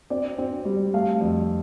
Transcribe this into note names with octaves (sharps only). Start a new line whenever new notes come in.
C4 D5
C4
G3
A3 F5
F2